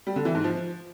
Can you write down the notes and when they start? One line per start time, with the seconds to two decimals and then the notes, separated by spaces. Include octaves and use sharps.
0.07 G3
0.16 D3
0.25 E3
0.35 G#2
0.44 F3